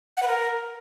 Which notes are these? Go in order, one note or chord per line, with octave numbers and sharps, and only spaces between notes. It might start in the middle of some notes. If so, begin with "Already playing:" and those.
F#5
B4
A#4